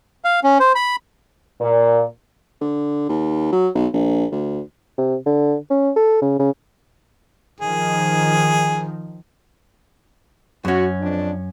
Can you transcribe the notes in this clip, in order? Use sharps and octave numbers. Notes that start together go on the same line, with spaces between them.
F5
C#4
C5
B5
A#2
D3
D#2
F#3
B1
A#1
D2
C3
D3
C#4
A4
C#3
C#3
D#3 F3 G#4
F#2 C#4 F#4
F2 D4